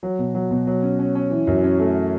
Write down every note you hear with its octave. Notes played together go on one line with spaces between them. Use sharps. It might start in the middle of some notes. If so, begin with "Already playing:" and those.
F#3
B2
F#3
B2
F#3
C#4
C#4
C#4
E3
F#2
C#4
A3